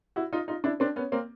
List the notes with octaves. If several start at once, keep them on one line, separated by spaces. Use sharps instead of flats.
E4 F#4
D#4 F4
D#4 F4
D4 E4
C4 D4
B3 C#4
A#3 C4